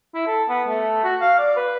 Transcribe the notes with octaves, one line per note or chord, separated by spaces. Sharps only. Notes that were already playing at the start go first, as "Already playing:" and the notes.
E4
A4
B3
A3
F#4
F5
D5
B4